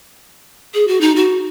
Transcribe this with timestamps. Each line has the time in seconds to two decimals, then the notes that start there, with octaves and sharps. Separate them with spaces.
0.74 G#4
0.88 F#4
1.01 D#4
1.16 F#4